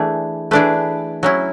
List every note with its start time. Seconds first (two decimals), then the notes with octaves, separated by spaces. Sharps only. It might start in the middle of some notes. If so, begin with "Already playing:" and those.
Already playing: E3 A3 D4 G#4
0.51 E3 A3 D4 G#4 B4
1.23 F#3 C#4 E4